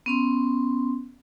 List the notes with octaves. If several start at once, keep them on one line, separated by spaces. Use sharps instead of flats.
B3 C#4 C6